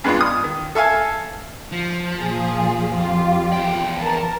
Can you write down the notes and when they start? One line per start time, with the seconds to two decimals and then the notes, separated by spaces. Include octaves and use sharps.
0.04 G2 G#3 B3 D4 F4
0.21 D#6
0.44 D#3
0.75 A4 E5 F5 G#5
1.72 F3
2.19 A#2 F4 G#4
2.92 F2 F4 G4
3.53 E2 G5
3.99 A#4 A5